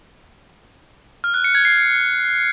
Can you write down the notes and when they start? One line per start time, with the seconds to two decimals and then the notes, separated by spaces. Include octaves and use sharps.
1.24 F6
1.34 F#6
1.44 C#7
1.55 G#6
1.65 C7